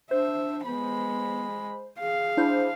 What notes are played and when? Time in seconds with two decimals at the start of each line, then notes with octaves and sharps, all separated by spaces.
0.11 D4 C5 E5
0.66 G#3 B3 B5
2.00 G#4 F5
2.37 D4 E4 C5